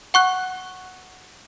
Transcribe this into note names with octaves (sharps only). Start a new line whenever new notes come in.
F#5 C#6 F#6